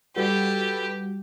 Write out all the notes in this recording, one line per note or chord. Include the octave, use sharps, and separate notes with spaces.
G3 F#4 G4 A4 B4